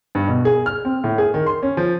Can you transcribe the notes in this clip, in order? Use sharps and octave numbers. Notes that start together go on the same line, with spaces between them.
G2
B2
G#4
F6
C4
A2
G#4
D#3
C6
C#4
F3